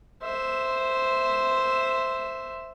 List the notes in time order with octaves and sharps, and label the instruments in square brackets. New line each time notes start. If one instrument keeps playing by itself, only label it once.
[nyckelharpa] C5 E5